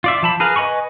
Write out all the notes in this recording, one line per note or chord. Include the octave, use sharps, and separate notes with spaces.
F4 D5 E5
F3 A5 B5
G#4 A#4 B4 F5
B4 D#5 G#5 B5 C#6